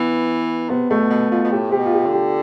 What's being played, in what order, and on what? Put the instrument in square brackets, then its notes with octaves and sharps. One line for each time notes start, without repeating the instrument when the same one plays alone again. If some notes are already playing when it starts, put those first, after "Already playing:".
Already playing: [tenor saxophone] E3 [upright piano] B3
[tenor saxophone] C3 [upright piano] B3
[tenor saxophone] B2 [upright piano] A3
[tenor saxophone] B2
[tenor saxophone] B2 [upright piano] F4
[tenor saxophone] B2
[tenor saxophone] A2 [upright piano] G4
[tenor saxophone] C3 [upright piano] G4
[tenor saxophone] B2
[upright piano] F4
G4
[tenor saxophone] D3
[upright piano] G4